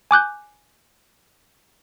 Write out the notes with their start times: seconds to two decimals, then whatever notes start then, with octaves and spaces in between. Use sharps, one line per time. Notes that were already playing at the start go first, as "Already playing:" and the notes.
0.11 G#5 D6 F#6 G6